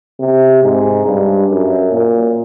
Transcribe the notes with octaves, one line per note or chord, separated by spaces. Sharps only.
C3
G#2
G2
F#2
A#2